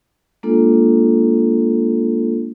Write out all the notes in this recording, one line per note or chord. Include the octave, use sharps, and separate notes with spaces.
G#3 A#3 D4 F4 A4